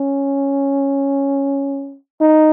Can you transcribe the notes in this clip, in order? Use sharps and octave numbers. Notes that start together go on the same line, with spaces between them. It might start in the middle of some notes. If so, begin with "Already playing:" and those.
Already playing: C#4
D#4